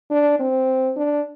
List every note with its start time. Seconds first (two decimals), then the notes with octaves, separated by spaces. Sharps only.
0.11 D4
0.40 C4
0.97 D4